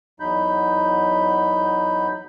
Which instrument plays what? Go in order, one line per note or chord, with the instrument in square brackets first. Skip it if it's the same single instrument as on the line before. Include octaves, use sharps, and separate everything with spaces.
[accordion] E2 F#3 D#4 B5 G6